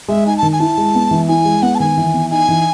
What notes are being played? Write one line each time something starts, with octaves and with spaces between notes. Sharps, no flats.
G#3 E5
D#4 G#5
A5
D#3
G#5
E4 A5
G#3
B3
E3
E4 G#5
G#3
B3 F#5
A5
D#3 G#5
E3
B3
D#4 G#5
E3